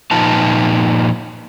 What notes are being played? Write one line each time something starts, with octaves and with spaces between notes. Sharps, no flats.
A#2 F3 D#4 F4 B4 A5